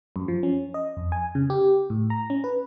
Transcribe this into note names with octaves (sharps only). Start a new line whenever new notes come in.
F#2
F3
C#4
D#5
F2
G#5
C#3
G4
A2
A#5
C#4
B4